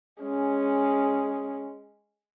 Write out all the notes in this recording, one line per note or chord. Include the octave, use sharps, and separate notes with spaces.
G#3 C#4